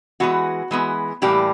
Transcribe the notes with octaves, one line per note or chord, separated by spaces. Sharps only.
E3 G#3 B3 F#4
E3 G#3 B3
A2 E3 G3 A#3 G4